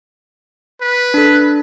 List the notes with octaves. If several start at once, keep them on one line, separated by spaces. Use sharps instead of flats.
B4
D4 A4